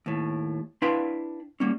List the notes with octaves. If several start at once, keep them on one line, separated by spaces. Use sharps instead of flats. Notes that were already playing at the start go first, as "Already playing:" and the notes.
D#2 A2
D4 E4 B4 F5 G5 C6
G3 A#3 C#4